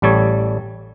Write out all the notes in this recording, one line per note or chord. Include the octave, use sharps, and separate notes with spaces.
A1 G3 A4 C#5